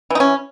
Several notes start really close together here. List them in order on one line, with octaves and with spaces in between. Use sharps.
E3 D#4 C#4